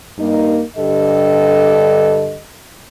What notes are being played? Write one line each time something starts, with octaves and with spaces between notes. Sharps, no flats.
G2 A#3 D#4
G2 D3 G4 A4 D#5